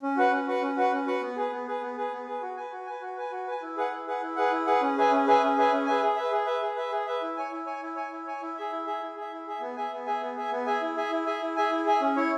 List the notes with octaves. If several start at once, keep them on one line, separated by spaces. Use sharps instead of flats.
C#4
F#4 B4 F#5
C#4
F#4 B4 F#5
C#4
F#4 B4 F#5
C#4
F#4 B4 F#5
B3
G#4 B4
B3
G#4 B4
B3
G#4 B4
B3
G#4 B4
F#4
B4 G#5
F#4
B4 G#5
F#4
B4 G#5
F#4
B4 G#5
E4
G#4 B4 F#5
E4
G#4 B4 F#5
E4
G#4 B4 F#5
E4
G#4 B4 F#5
C#4
G#4 B4 E5 G#5
C#4
G#4 B4 E5 G#5
C#4
G#4 B4 E5 G#5
C#4
G#4 B4 E5 G#5
G#4
B4 E5
G#4
B4 E5
G#4
B4 E5
G#4
B4 E5
E4
C#5 G#5
E4
C#5 G#5
E4
C#5 G#5
E4
C#5 G#5
E4
G#4 E5
E4
G#4 E5
E4
G#4
E5
E4
G#4 E5
B3
G#4 E5 G#5
B3
G#4 E5 G#5
B3
G#4 E5 G#5
B3
G#4 E5 G#5
E4
G#4 E5 G#5
E4
G#4 E5 G#5
E4
G#4 E5 G#5
E4
G#4 E5 G#5
C#4
E4 C#5